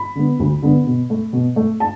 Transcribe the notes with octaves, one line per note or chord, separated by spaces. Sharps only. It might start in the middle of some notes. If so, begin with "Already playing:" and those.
Already playing: B5
D3 B3
D2
D3 B3
B2
A3
B2
A3
A5